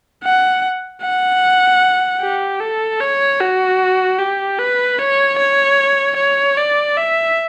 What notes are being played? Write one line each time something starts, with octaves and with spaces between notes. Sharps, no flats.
F#5
F#5
G4
A4
C#5
F#4
G4
B4
C#5
C#5
C#5
D5
E5